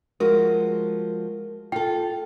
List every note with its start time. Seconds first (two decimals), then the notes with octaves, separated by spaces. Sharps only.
0.20 F3 G#3 F#4 A#4
1.72 F4 A4 G5